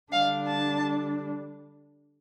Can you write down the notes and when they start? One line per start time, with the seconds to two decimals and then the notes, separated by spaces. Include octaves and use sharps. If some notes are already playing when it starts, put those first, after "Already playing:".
0.12 D3 G3 D4 F5
0.48 A5